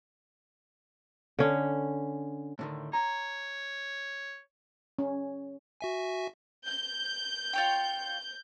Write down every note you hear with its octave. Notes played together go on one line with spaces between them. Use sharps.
D3 C#4
A2 D3 D#3
C#5 A#5
C#4
F#4 E5 G#5
G6
F4 C#5 G5